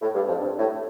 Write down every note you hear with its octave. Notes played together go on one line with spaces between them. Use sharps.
A2
G2
F2
G2
A2